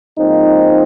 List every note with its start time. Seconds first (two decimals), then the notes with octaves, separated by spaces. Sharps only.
0.18 G#2 F3 A#3 C4 D#4